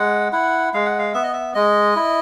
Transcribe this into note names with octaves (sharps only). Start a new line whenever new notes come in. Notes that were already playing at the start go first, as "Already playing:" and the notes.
Already playing: G#3 F#5
E4 F#5
G#3 F5
F#5
F5
B3 E5
D#5
E5
G#3 D#5
E4